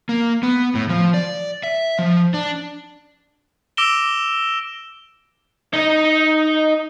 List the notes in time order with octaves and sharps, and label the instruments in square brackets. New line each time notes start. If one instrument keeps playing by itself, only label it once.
[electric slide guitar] A#3
B3
A2
F3
D5
E5
F3
D4
[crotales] D6 E6 A#6 D7 E7 G7
[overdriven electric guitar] D#4 D#5